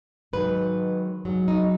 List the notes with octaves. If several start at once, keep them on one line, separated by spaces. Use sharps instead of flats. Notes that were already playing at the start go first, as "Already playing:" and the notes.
G#2 D#3 F#3 B4
G#2 F#3
D#4